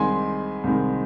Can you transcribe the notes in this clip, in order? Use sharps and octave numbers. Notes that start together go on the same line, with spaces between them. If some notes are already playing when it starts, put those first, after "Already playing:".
Already playing: C2 C3 D#3 G#3 G#5 C6
C2 C3 D#3 G#3